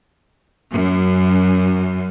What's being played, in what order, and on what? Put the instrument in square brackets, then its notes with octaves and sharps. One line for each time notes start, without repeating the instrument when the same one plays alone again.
[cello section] F#2